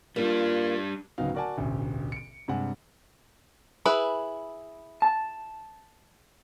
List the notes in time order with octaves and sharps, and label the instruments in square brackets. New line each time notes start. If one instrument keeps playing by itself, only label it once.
[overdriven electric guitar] G3 D4 [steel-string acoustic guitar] A#3 [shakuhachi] F4
[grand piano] D1 C#3 F#3 B3 D#4 F5
F#4 A#4 D5 F#5 G#5 A5
E1 A1 D2
C#7 D7
G2 C3 G#3 F#5 G#5
[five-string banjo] E4 G#4 B4
[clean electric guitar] A5